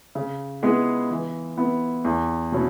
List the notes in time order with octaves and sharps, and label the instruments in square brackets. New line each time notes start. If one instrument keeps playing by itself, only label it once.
[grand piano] C#3
G#3 B3 E4 G#4
E3
B3 E4
E2
B2 F#3 C#4 E4